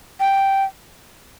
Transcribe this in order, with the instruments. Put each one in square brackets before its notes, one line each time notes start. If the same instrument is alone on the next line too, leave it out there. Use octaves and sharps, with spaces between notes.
[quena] G5